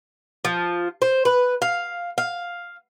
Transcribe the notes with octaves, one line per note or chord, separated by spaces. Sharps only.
F3
C5
B4
F5
F5